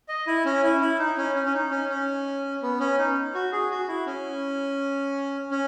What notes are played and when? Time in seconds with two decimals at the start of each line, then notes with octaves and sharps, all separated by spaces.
0.08 D#5
0.27 E4
0.45 C#4
0.63 E4
0.81 E4
0.99 D#4
1.17 C#4
1.35 C#4
1.46 C#4
1.53 D#4
1.71 C#4
1.89 C#4
2.62 B3
2.80 C#4
2.98 D#4
3.35 F#4
3.52 G#4
3.71 F#4
3.88 E4
4.06 C#4
5.51 C#4